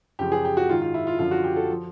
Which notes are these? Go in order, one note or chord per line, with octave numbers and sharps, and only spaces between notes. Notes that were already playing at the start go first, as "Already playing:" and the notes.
F#2 C#3 F3 G4
G#4
G4
F#4
G#2 D#3 F4
F4
E4
F4
F#2 D3 F3 F4
F#4
G4
A4
F3